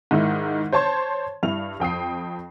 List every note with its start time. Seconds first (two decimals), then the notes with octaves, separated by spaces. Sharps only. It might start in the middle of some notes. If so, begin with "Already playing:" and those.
0.11 G#2 D#3 D#4 E4
0.73 C5 C#5 A5 C6 G#6
1.43 G2 E4 F7
1.80 F2 G5 D#6 C7